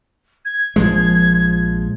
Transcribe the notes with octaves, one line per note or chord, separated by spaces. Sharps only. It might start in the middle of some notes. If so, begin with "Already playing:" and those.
G#6
A#1 F3 G#3